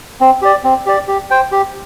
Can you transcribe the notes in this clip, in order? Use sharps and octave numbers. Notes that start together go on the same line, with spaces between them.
C4
G4 D5
C4
G4 D5
G4
C5 G5
G4